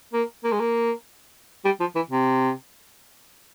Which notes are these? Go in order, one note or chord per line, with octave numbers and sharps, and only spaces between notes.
A#3
A#3
G#3
A#3
G3
F3
E3
C3